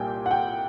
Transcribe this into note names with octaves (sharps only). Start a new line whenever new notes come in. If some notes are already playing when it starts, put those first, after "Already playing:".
Already playing: C2 A#2 G3 A#3 G5 G#5
F#5
G5